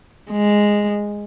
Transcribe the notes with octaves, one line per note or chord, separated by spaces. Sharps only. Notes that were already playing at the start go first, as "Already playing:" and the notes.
G#3